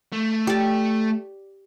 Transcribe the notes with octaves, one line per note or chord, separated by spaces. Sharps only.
A3
G4 D5